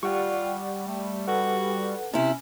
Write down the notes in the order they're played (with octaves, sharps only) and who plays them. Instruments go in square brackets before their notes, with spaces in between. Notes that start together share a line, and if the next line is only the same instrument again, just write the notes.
[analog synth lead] G3 [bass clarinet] F4 [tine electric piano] D5 F#5 C#6
[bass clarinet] A3
[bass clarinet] F#4 [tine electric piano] A4 B4 F#5
[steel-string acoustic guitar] C3 E4 [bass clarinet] C#4